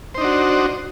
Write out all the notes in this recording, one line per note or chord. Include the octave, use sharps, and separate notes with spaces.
D4 D#4 F#4 C5